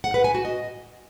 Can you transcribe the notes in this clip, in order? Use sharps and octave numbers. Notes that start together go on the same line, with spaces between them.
F#5
B4
G#5
F#4
D#5